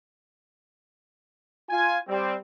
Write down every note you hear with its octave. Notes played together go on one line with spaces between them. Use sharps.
F4 G#5
G3 C4